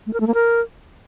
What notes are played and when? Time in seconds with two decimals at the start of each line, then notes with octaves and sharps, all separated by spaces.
0.06 A3
0.13 A#4
0.20 A3
0.27 A#3
0.34 A#4